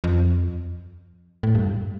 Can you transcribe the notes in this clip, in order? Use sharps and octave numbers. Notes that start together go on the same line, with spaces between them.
F2
A2
G2